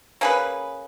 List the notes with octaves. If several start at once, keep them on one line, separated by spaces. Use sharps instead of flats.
A#3 C#4 G#4 B4